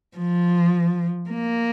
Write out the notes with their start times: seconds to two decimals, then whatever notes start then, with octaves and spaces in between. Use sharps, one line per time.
0.18 F3
1.30 A#3